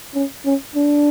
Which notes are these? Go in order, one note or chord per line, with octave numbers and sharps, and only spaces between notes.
C#4
C#4
D4